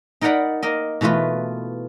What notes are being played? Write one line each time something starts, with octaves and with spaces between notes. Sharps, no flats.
D#4 A#4 D5 F#5 A#5 B5
A#3 A#4 D#5
B2 E3 A3 F4 B4